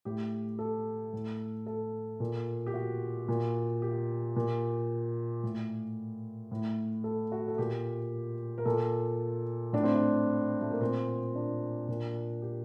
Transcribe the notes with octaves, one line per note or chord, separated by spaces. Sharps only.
A2 G4
A4
A2
A4
A#2
G4
F#4
A#2
G4
A#2
A2
A2
A4
F#4
A4
A#2 G4
A#4
A#2 A4
A2 D4
C4
D4
A3
A#3
A#2 C4
D4
A#2
G4